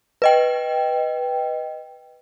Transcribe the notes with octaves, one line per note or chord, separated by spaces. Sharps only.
B4 D#5 G5